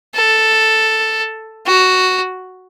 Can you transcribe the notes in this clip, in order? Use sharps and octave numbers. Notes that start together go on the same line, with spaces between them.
A4
F#4